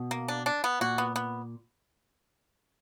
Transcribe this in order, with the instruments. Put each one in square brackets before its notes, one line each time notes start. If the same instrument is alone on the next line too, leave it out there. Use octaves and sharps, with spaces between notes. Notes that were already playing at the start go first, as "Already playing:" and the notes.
Already playing: [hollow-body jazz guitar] B2
[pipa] A#3
D4
D4
B3
[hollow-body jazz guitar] A#2 [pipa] F#4
[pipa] B3
B3